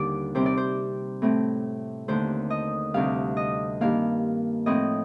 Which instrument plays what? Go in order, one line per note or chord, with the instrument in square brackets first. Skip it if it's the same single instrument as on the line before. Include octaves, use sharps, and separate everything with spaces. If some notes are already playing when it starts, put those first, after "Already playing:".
Already playing: [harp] D#2 D3 G3 D5
C3 G3 C4 C5
D5
C5
A2 A3 C4
D#2 D3 A3 C5
D#5
D2 C3 G3 F5
D#5
G2 D#3 A#3 F5
A2 F3 C4 D#5